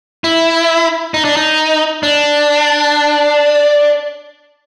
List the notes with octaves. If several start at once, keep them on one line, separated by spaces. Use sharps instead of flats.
E4
D#4
D4
D#4
D4